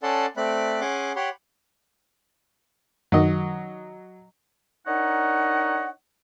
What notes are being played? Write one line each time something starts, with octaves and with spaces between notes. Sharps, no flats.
C#4 A4 D5 F#5 A5 C6
A3 C4 D5 B5 F#6
C#4 G#4 F#5 C6 D6
G4 C#5 F#5 B5 C6
F#2 D#3 F#3 D#5
D4 D#4 A#4 C#5 D#5 F#5